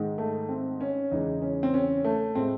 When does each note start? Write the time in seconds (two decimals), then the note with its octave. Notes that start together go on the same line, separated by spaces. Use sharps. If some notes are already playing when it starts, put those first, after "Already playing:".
Already playing: G#2 D#3 G#3
0.18 A3
0.49 C4
0.81 C#4
1.11 E2 C#3 E3 G#3 D#4
1.42 C#4
1.63 C4
1.74 C#4
2.05 A3
2.35 A2 G#3 C4